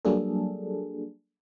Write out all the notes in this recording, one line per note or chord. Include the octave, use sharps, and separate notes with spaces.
F#3 G3 A#3 D4 G#4 A4